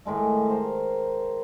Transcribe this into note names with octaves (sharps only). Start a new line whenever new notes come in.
A2 D#3 G#3 A3
A#4 C5